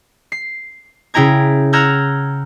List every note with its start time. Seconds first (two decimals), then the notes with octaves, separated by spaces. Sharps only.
0.32 C7
1.14 C#3 E4 G5 A#5 G#6
1.73 F#5 A#5 E6 F6 G6 G#6